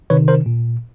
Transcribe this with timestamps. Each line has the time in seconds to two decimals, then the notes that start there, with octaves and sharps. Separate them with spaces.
0.10 C3 D#3 B4 C#5
0.28 A#4 C5
0.46 A#2